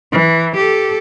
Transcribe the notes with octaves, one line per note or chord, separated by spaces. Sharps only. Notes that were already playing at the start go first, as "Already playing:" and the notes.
E3
G4 A4